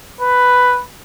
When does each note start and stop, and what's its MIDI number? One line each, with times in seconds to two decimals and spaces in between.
0.21 0.82 71